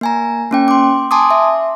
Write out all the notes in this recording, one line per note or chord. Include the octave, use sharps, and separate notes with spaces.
A#3 G#5 A#5
A#3 C#4 G5
C6 D6
G#5 A5 C6 D6 D#6
E5